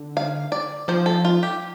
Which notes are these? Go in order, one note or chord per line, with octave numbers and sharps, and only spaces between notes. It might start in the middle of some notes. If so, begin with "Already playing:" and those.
Already playing: D3
F5
D5
F3 C5
A4
F4
G4